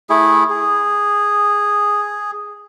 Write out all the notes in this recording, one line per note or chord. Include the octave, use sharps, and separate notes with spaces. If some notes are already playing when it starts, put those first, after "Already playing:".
A3 E4 G#4
G#4